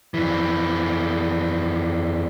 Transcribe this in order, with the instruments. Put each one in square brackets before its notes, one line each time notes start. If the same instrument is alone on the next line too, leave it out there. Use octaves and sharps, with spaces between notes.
[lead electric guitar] F2 E3